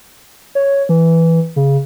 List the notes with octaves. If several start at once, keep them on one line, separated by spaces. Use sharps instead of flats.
C#5
E3
C#3